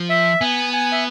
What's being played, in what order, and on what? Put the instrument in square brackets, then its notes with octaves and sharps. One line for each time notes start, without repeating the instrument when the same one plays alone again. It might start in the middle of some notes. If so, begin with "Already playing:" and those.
Already playing: [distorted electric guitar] F3
[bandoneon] E5
[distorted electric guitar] B3 [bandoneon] G#5
[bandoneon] G#5
E5